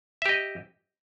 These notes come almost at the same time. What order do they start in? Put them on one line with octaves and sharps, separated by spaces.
E5 G4 D#5